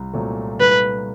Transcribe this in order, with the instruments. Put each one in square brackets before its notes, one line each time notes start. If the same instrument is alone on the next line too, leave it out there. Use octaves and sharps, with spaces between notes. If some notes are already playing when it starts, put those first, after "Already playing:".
Already playing: [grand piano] C2
A#2 F#3 A3 C4
[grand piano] C2 [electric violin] B4